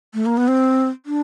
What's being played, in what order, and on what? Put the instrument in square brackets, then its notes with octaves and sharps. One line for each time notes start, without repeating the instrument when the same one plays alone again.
[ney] A3
A#3
B3
C4
D4